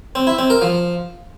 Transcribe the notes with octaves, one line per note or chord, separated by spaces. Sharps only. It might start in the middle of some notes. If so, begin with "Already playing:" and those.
C4
E4
C4
A#4
F3